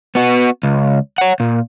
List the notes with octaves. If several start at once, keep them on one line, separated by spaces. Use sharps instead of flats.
B3 F#4
C#2
C#5 F#5
A#2